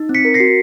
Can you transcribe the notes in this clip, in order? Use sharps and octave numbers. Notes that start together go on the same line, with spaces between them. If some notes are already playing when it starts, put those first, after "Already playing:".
Already playing: D#4
C4
B6 C#7
A#4
A#6 C7
F#4